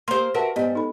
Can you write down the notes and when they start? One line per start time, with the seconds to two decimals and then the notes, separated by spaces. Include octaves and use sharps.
0.08 A#3 G4 C5 C6
0.35 F#4 A#4 B4 E5 F#5 A5
0.56 G#2 G3 B3 G4 D#5
0.75 D#4 A4 B5